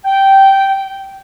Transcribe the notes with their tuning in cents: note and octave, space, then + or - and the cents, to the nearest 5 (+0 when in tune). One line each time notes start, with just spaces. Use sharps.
G5 -10